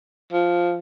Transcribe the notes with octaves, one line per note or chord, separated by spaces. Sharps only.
F3